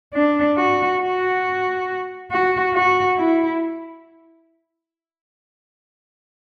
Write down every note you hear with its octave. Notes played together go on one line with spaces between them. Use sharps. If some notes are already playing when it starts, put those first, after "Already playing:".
D4
F#4
F#4
F#4
F#4
E4